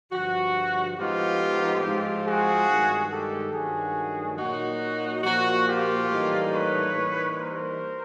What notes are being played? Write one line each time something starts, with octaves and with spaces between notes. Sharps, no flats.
G2 D3 F3 F#4
A2 F3 G#3 B3 D#4 F4 G4
G#2 F3 G#3 C4 F4
F#4 G#4
G2 D#3 G#3
G4 A4
G2 D#3 F#3 A3 D4 F#4 G#4
A#2 F#3 A#3 D#4 F#4
A#2 F3 A#3 F#4
F4 G4
A2 E3 G3 A#3 D#4
B4 C#5
E3 G3 A#3 D#4
A#4 C5